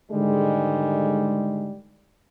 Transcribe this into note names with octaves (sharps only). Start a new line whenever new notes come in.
G#2 D3 D#3 G3 G#3